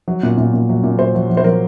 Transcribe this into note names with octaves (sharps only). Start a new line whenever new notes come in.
F#3
A#2
A#2
A#2
F#3
A#2
F#3 C5
F#3
F#3
C5
F#3 A#4